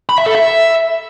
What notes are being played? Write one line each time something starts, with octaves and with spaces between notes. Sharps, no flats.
B5
E5
A4
E5